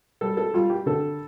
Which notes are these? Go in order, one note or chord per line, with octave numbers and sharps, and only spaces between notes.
G3 A4
A4
G3 F4
G4
D3 A4